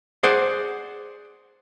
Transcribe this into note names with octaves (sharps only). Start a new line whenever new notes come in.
G#4 C5 D5 F#5